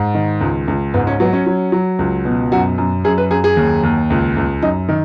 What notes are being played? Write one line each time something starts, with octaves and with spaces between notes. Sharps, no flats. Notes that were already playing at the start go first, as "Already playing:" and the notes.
Already playing: G#2
D#3
C#2
C#2
G#2 B3
C#4
F#3 B3
C#4
F#3
F#3
C#2
B2
F#2 F#4
F#2
F#2 G#4
B4
F#2 G#4
G#4
D#2
D#2
C#2
C#2
F#2 D#4
D#3